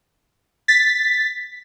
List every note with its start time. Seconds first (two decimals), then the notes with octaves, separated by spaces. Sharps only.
0.68 A6 B6